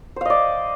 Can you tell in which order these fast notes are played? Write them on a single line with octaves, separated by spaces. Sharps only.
C5 F5 D#5 D5